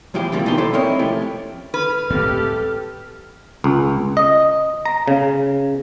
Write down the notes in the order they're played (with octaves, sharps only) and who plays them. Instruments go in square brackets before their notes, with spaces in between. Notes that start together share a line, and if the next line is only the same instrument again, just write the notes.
[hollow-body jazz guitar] B1 E2 F3 E4 G4 G#4
C#3 E3 F3 G3 A#3 C4
B2 D#3 G3 D#4 G4 C6
E4 A4 C5 D5
G#3 C4 E4 A#4 C#5 D#5
C3 F3 A3 C#4 G4
[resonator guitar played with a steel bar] B4 [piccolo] F6
[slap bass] C#2 A2 C4 [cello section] G4 A4
[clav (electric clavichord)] C#2
D#5
A#5
C#3